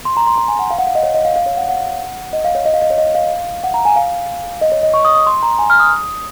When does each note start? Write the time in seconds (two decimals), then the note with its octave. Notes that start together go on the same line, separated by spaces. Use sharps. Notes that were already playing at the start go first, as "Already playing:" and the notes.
0.05 C6
0.17 A#5
0.27 C6
0.38 A#5
0.48 G#5
0.59 F#5
0.71 F5
0.79 F#5
0.87 F5
0.95 D#5
1.03 C#5
1.14 D#5
1.25 F5
1.36 F5
1.46 C#5
1.57 F#5
1.69 F#5
2.33 D#5
2.44 F5
2.55 C#5
2.65 D#5
2.74 F5
2.82 D#5
2.90 C#5
2.98 D#5
3.15 F5
3.64 F#5
3.74 A#5
3.85 G#5
3.96 F5
4.61 D#5
4.72 C#5
4.83 D#5
4.94 C#6
5.05 D#6
5.15 D#6
5.27 C6
5.43 A#5
5.59 G#5
5.70 F6
5.80 D#6